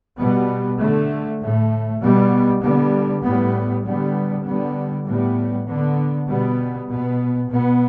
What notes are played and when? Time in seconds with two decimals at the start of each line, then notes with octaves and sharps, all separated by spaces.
0.18 B2 G3 B3
0.79 D3 A3
1.41 A2 A3
2.01 B2 G3 B3
2.62 D3 G3 B3
3.23 A2 G3 B3
3.84 D3 G3 B3
4.45 D3 G3 B3
5.06 A2 G3 B3
5.66 D3 B3
6.28 B2 G3 B3
6.89 B2 B3
7.50 B2 B3